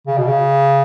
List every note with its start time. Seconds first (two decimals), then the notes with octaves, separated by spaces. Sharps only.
0.08 C#3
0.18 B2
0.28 C#3